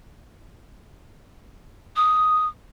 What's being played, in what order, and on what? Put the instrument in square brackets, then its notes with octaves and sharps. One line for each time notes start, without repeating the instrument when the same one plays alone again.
[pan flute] D#6